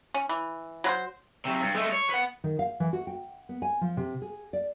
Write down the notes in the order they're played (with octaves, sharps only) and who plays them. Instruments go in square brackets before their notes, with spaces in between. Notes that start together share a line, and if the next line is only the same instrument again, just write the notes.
[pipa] C#4
E3
F#3 B4 C5
[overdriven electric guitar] C3 F#3
G2
G#3 A3
C#5
B4 F#5
[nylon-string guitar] D#3
F5
E3
F#4
G5
B3
G#5
F3
C3
G#4
D5